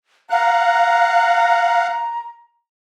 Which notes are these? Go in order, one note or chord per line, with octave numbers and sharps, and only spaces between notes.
F5 F#5 A#5 F#6